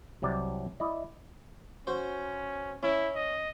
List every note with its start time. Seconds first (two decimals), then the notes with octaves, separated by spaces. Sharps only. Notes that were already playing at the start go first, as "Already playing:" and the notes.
0.22 C2 C3 F#3 D5
0.80 E4 D5 D#5
1.87 C#4 F#4 C5
2.83 C#4 E4
3.15 D#5